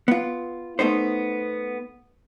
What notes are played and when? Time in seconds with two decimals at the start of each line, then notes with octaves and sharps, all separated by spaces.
0.08 B3 F4
0.79 A3 B3 D#4 C5